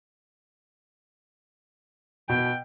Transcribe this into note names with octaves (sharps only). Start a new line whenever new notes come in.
B2 G5